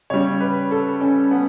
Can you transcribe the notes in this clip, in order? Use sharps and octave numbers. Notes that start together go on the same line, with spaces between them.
C#3 G3 C#5
B4
A4
C#4
B3